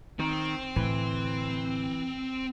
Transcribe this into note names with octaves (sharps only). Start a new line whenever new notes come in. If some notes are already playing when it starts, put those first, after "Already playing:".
D#3 C4
A2 D3 E3